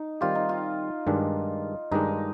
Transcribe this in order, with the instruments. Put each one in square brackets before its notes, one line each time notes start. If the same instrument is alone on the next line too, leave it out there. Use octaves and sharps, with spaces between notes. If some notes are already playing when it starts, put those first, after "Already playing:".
Already playing: [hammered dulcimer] D#4
[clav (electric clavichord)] D#3 G3 C4 G4 [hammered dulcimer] F4
[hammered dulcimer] D#4
F4
[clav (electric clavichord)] G2 D#3 G#3 D4
[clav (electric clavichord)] G2 D#3 G#3 D4 [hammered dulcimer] D#4